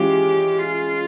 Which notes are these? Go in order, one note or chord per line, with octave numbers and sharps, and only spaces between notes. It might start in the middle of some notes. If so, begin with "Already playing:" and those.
Already playing: E3 G#3 C#4 F4 G4
F4